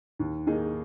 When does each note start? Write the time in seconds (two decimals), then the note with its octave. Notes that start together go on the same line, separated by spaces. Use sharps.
0.19 D#2
0.47 D#3 A#3 D#4 G#4